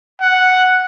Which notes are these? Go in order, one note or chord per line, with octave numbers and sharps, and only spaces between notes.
F#5